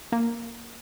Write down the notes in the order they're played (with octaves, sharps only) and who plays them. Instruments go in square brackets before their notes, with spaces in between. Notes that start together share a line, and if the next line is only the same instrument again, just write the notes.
[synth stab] A#3